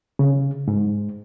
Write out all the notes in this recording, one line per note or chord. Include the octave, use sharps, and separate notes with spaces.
C#3
G#2